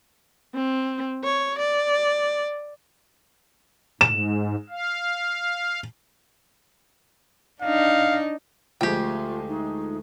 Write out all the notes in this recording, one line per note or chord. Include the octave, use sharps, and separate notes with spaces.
C4
C#5
D5
G#2 E7
F5
D4 D#4 F5
D2 F3 G#3 A3 F4 G4 G5
D#4